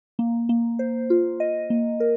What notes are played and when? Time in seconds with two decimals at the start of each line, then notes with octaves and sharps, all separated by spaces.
0.19 A#3
0.49 A#3
0.79 C5
1.10 F4
1.40 D#5
1.70 A#3
2.00 A#4